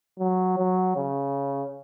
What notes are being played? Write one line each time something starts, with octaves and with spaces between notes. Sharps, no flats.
F#3
F#3
C#3